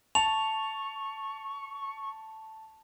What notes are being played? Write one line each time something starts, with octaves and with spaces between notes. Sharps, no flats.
A5 C#6 F7